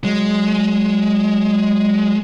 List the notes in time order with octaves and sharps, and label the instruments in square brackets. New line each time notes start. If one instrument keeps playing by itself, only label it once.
[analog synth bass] F#3 [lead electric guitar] G#3